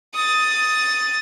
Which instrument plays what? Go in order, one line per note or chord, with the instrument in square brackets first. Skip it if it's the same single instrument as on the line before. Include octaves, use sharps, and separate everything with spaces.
[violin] D#6 A6